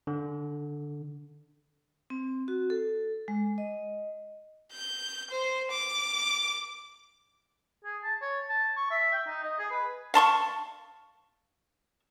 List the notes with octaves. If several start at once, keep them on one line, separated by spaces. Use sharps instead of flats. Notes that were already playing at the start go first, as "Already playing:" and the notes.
D3
C4
F#4
A4
G#3
D#5
G6
C5
D6
G#4
A5
C#5
A5
C#6
E5
G5
D#4
D#5
G#4
B4
F5 A5 C6 C#6